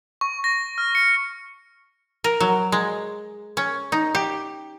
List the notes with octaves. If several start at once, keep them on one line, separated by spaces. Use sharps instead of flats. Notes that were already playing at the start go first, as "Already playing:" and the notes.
C#6
A#6
F6
C#7
A#4
F#3
G#3
C#4
D#4
G4